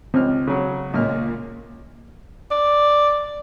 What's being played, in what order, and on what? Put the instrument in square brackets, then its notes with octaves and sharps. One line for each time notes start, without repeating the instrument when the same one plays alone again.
[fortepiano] C#2 F6 [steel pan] C4
[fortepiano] C#3 F#3
[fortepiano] C#2 F6 [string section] A#2
[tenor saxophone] D5